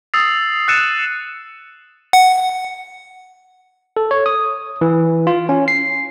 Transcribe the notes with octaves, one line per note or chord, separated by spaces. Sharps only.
D#6 E6 A6 C7
E6 F#6 A6 C#7 D#7 E7
F#5
A4
C#5
D#6
E3
F4
C#4
C7